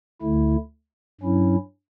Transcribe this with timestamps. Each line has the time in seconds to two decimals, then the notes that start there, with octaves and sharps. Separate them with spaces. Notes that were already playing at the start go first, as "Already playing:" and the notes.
0.21 D2 D3 A3 E4
1.21 G2 F#3 C#4 E4